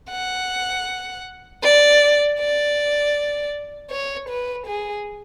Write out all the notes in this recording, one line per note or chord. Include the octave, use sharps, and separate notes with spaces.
F#5
D5
D5
C#5
B4
G#4